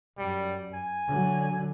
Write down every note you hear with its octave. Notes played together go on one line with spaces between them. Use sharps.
F#2 G3
G#5
D3 F#3